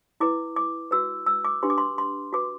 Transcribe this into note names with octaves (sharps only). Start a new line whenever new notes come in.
E4 B4 D6
D6
F#4 B4 E6
E6
D6
D4 G4 B4 C6
D6
C6
C6
F#4 B4 D6